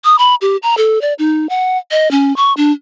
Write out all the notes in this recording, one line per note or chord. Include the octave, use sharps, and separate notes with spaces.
D#6
B5
G4
A#5
A4
D5
D#4
F#5
D#5
C#4
C#6
D4